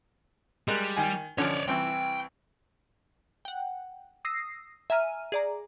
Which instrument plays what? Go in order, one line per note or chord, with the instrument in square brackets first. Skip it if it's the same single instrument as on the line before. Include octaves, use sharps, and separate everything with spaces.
[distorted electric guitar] G3 [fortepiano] G#3 A#4 F#6
[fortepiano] D#3 G#5
[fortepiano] D3 F3 C#4 [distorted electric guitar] C#5 D5
[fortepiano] C2 E3 C4 [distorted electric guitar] G5
[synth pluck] F#5 G5
D#6 E6 A#6 C7
E5 G#5 A#5 F6 D#7
G#4 D5 A#5